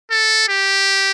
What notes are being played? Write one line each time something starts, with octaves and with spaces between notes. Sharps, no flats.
A4
G4